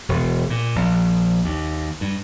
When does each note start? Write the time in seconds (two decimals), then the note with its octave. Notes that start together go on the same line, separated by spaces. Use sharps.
0.09 E1
0.50 A#2
0.76 A#1
1.44 D#2
2.01 G2